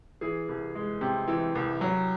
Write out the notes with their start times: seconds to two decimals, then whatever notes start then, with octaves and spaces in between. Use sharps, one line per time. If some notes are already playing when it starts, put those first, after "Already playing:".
0.21 E3 G#4
0.48 C2
0.75 G#3
1.01 C3 G4
1.28 E3
1.55 C2
1.81 F#3